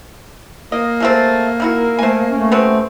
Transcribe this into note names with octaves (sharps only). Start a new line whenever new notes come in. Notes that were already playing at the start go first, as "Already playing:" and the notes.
A#3 D#5
G#3 A3 C4
D#3 E4 F#4 A#4
A3 C5 G#5
A3 C#4
B2 B3 C4